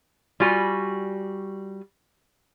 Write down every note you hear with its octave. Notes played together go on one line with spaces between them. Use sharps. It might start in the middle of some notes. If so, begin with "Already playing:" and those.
G3 F4 F#4 G#5